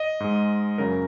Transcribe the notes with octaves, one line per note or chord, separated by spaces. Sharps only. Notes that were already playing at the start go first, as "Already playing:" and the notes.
Already playing: D#5
G#2 G#3
F#2 C#3 F#3 A#4